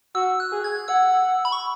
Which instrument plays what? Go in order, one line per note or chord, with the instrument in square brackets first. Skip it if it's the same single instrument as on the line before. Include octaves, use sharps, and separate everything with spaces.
[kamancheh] F#4 [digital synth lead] E6
[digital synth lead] F#6
[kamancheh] G#4
[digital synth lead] G#6
[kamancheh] F#5 [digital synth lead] E6
[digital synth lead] B5
C#6